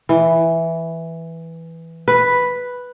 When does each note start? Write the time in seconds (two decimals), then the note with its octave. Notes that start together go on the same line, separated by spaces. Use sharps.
0.09 E3
2.08 B4